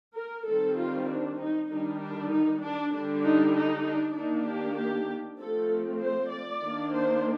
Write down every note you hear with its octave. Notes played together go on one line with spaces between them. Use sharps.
A#4
D#3 G3 C4 A4
F4
D4
D#4
D#3 G3 D4 D#4
D4
D#4
D4
D3 G3 D4
D#4
D#4
D4
D#3 A#3 D4 D#4
G4
G4
F3 A3 C4 A4
C5
D5
D#3 A#3 D4
C5